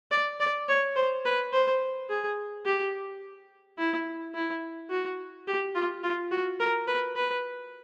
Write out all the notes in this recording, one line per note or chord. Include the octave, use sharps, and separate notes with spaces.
D5
D5
C#5
C5
B4
C5
G#4
G4
E4
E4
F#4
G4
F4
F4
F#4
A#4
B4
B4